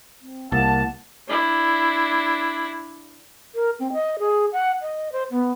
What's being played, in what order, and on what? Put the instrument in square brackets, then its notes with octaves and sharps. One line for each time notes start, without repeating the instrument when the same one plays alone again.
[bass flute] C4
[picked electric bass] C2 [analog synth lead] A#3 [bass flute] F#5 [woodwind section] A5
[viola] D4 E4
[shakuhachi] A#4
C4
D#5
G#4
F#5
D#5
C5
B3